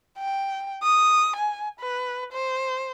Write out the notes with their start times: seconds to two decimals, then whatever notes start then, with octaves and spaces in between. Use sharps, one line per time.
0.18 G5
0.83 D#6
1.36 G#5
1.80 B4
2.33 C5